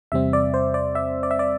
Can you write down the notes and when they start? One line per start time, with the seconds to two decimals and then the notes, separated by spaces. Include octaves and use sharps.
0.12 E2 C3 G3 C4 E5
0.33 D5
0.54 C5
0.74 D5
0.95 E5
1.23 D5
1.31 E5
1.39 D5